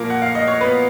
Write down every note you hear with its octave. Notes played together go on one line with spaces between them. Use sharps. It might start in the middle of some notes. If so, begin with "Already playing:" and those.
Already playing: A#2 F3 A#3 A#4
F#5
F5
D#5
C#5
B3 B4